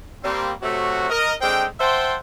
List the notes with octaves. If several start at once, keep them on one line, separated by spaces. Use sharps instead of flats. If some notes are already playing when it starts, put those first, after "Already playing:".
G3 A#3 C4
C3 F#3 A3 F#4
A#4 D#5
G#3 C4 D4 A4 G5
C5 E5 F#5 G5 A5 C6